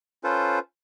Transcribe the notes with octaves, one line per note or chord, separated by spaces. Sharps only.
C#4 F4 A4 B4 C5